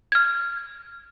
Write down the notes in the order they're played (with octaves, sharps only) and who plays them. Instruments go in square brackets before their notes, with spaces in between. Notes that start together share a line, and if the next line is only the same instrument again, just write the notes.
[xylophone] F6 G#6